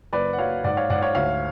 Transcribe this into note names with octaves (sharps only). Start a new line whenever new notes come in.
F#1 B4 D5
F#5
F#3 C#5 F5
G#2 D5 F#5
C#5 F5
G#2 D5 F#5
C#5 F5
D2 C#5 F5